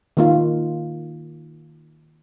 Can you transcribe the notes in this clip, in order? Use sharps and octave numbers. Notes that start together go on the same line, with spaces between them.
D#3 A#3 F4